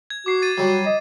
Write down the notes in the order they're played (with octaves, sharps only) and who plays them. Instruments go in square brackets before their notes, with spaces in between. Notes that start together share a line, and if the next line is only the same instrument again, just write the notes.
[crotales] G#6
[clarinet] F#4 [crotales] D6 C7
[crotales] A6 D#7
[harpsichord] F#3 G3 [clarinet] F#4
[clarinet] D#5